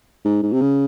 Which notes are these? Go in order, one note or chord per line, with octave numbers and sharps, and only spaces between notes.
G#2
G#2
C3
C#3